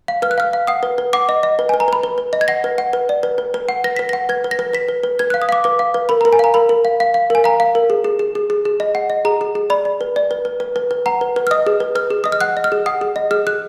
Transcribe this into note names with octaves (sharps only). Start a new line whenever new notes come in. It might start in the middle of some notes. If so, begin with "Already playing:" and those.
F5
B4 F6
F#6
F5 F6
F5
F#5 D#6
B4
B4
F#5 D6
D#5
D#5
B4
G#5
B4
A#5
B4 B5
B4
B4
D#5
G#6
F#5 A#6
B4
F#5
B4
D5
B4
B4
B4
F#5
B4 A#6
B4 B6
A#6
F#5
B4 G#6
B4
A#6
B4
B4 B6
B4
B4
B4 G#6
F#6
F5
D#6
F5 D6
B4 D6
F5
B4
A#4 B5
A#5
A#4
G#5
F5 A#5
A#4 B5
A#4
F5
F5
F5
A#4 G#5
F5 A#5
F5
A#4
G#4
G#4
G#4
G#4
G#4
G#4
D#5
F#5
D#5
G#4 A#5
G#4
G#4
D5 B5
D5
B4
D5
B4
B4
B4
B4
B4
F#5 A#5
B4
B4
F6
D#5 D#6
G#4
B4
B4 F6
G#4
D#5 D#6
F6
F#5 F#6
D#5
F6
G#4
F#5 D#6
G#4
D#5
G#4 F6
G#4 F#6